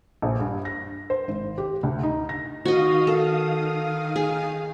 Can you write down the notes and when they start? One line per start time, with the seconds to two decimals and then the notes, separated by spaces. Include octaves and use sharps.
0.22 A#1
0.39 G2
0.65 A#6
1.10 C5
1.28 G#1
1.58 G4
1.83 D2
2.03 D#4
2.29 A#6
2.65 D#3 F#4 D#5 F5 D#6
3.07 A4
4.16 G#4